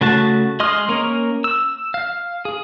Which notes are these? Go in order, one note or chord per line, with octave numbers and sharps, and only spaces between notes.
C#3 A3 F#4 A5
G#3 D#5 C6 D#6 F6
A#3 C#4 A#4
E6
F5
G#4